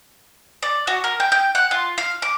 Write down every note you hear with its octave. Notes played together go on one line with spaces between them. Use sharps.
D5
F#4
A#4
G5
G5
F#5
F4
F5
D6